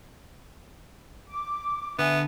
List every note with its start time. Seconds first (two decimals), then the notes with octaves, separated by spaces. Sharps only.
1.27 D6
1.99 D3 B3 E5 G#5